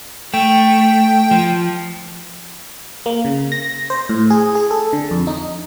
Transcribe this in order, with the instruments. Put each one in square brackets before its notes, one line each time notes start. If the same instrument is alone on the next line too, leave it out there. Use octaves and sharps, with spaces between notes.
[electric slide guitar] A3 [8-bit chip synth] G5
[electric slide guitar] F3
[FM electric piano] A#3
C#3
A#6
C5
A2
G#4
G#4
A4
D3
F2
D#4